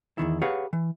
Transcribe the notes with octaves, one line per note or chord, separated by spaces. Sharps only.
E2 G#2 D#3 E4
G4 G#4 B4 C#5 F5 F#5
E3